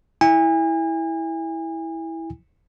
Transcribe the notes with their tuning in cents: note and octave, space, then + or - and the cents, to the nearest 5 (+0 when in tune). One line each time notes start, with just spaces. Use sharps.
E4 -10 G#5 -35